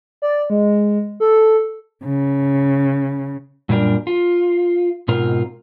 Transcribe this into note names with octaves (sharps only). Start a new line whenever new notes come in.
D5
G#3
A4
C#3
F#2 A#2 G3 D4 A#4
F4
G#2 B2 C4 F4 A#4